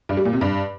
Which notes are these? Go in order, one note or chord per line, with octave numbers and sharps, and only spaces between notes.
G2
G3
A#2
C3
G2